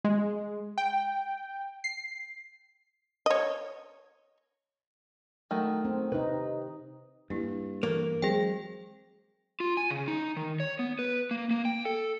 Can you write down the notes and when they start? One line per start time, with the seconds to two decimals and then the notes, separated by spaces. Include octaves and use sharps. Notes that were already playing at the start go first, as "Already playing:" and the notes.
0.05 G#3
0.78 G5
1.84 C7
3.26 C#5 D#5
5.51 D#3 F#3 A3
5.85 C4
6.12 C3 D#4 B4
7.30 G2 A#3 D4 E4
7.83 E3 A#3 A4
8.22 F#3 G#3 C4 G#4 G5
9.60 F4
9.77 G#5
9.90 C#3
10.08 D#4
10.36 D#3
10.60 C#5
10.79 B3
10.99 B4
11.31 A#3
11.51 A#3
11.65 G5
11.85 A4